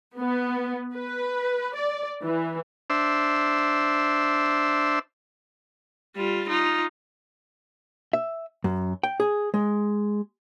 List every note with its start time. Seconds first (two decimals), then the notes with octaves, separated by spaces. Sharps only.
0.18 B3
0.94 B4
1.74 D5
2.22 E3
2.90 D4 C5 E5
6.16 G3 F4
6.49 D#4 F4
8.13 E5
8.64 F#2
9.04 G5
9.20 G#4
9.54 G#3